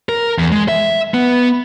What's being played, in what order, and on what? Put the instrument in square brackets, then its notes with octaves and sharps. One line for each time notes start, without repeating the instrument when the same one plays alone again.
[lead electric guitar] A#4
E2
G#3
E5
B3